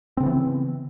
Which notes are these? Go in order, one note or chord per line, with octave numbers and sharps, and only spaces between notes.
C#3 E3 B3 C4